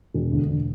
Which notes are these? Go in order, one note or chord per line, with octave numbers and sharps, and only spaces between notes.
E1
D2
E1